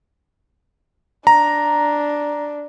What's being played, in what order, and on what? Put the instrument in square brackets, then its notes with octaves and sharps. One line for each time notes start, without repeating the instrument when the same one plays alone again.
[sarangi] D4 [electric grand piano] A#5